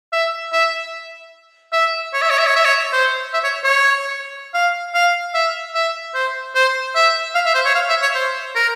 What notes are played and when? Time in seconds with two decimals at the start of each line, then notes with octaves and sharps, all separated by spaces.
0.13 E5
0.52 E5
1.72 E5
2.13 C#5
2.22 E5
2.30 C#5
2.38 E5
2.47 C#5
2.56 E5
2.65 C#5
2.93 C5
3.34 E5
3.44 C#5
3.64 C#5
4.54 F5
4.94 F5
5.34 E5
5.75 E5
6.15 C5
6.55 C5
6.95 E5
7.35 F5
7.46 E5
7.55 C5
7.65 C#5
7.75 F5
7.89 E5
8.02 C#5
8.15 C5
8.56 A#4